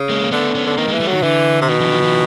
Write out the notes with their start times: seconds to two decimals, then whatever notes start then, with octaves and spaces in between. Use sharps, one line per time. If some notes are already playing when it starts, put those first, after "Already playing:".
Already playing: C#3
0.09 G#3 A#3
0.21 A#3
0.31 D3 A3 B3
0.55 B3 C#4
0.66 D3
0.77 D#3 A#3 C4
0.88 E3 G#3 A#3
1.00 G3 A3
1.08 D#3 F#3
1.23 D3 E3
1.61 C3
1.68 B2 D#3
1.80 D3 E3
1.91 D#3 F3
2.02 D#3 F3